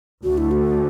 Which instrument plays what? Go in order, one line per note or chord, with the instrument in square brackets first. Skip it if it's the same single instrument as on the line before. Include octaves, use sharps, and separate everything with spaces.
[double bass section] D2 D3 A3 [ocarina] F#4
[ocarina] E4
F#4